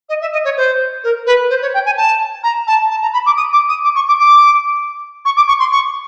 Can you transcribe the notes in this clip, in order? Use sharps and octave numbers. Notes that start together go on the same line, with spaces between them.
D#5
E5
D#5
C#5
C5
A#4
B4
C5
C#5
G5
G#5
A5
A#5
A5
A5
A#5
B5
D6
D#6
D6
D#6
D6
C#6
D6
D6
C#6
D6
C#6
C6
C#6